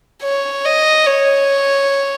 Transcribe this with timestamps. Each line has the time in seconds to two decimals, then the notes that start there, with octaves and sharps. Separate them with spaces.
0.23 C#5
0.65 D#5
1.06 C#5